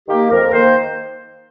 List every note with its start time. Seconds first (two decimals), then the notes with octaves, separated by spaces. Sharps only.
0.09 D#3 A#3 G4
0.31 F2 A#4
0.53 D#3 A#3 C5